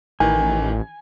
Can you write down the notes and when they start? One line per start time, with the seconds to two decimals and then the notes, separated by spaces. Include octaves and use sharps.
0.20 A1 D#3 E3 G#5